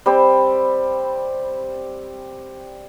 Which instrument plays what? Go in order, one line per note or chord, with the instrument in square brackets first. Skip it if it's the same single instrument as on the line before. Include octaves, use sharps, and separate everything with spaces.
[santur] G3 C4 G4 C5